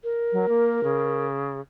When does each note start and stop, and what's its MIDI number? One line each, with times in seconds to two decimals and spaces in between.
0.04 1.27 70
0.33 0.46 54
0.49 0.83 58
0.84 1.60 49